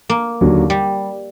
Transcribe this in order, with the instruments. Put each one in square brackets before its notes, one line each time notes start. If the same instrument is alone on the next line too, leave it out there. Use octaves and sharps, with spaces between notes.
[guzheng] A#3
[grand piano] D#2 D3 F#3
[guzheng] G3